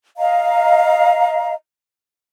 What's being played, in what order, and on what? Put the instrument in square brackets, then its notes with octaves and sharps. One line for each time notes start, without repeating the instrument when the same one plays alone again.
[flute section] D#5 F5 A#5